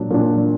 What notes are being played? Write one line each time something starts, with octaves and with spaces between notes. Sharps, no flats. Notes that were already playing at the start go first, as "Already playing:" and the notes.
Already playing: A#2 F#3 D4
A#2 F#3 D4